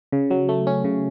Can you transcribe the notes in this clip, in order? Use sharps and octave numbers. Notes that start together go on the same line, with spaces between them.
C#3
F#3
A3
C#4
C#3